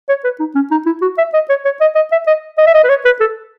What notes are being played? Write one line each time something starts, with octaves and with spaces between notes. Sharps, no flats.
C#5
B4
D#4
C#4
D#4
E4
F#4
E5
D#5
C#5
C#5
D#5
D#5
E5
D#5
D#5
E5
D#5
B4
C#5
B4
A4